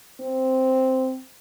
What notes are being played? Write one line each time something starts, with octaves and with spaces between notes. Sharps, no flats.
C4